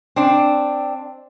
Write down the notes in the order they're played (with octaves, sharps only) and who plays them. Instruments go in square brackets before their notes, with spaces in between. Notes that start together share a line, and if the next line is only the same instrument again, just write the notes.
[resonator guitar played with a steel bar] C4 D4